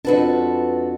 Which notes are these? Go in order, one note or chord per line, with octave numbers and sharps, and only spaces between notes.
F2 D4 F#4 A4 B4